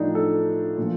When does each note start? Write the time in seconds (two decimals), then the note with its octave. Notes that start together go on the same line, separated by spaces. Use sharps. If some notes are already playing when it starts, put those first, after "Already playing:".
Already playing: A2 F3 D4 D#4
0.15 A4
0.77 A#2 F3